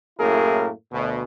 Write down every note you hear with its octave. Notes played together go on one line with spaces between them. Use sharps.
F#2 A2 A#3 E4 G#4 A#4
D2 B2